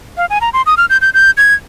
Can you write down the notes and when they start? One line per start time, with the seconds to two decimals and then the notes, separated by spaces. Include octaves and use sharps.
0.17 F5
0.30 G#5
0.41 A#5
0.53 C6
0.66 D#6
0.77 F6
0.90 G6
1.01 G6
1.14 G6
1.37 G#6